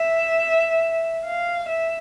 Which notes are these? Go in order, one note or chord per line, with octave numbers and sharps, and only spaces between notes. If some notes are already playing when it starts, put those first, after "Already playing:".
Already playing: E5
F5
E5